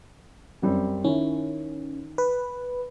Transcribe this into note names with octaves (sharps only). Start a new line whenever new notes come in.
F#2 G3 C4
D#3 C#4 E4
B4